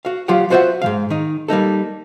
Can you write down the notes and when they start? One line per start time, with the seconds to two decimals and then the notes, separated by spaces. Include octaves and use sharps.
0.05 F#4 F5
0.28 F#3 F4 G4 F5 F#5
0.50 F4 F#4 C5 C#5 E5 F#5
0.82 G#2 F3 F5
1.10 D#3 D#4
1.48 G3 A#3 D#4 A4